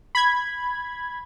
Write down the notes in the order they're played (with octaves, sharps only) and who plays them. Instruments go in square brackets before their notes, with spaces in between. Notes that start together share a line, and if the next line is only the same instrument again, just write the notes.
[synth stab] B5 G#6